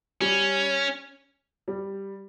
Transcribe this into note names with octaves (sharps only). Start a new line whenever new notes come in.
G3 C#4
G3